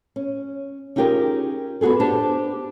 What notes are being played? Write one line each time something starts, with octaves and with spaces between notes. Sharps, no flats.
C#4
C#4 D#4 F4 G4 G#4 A#4
B3 F4 F#4 G#4 A4
D4 G4 C5 A5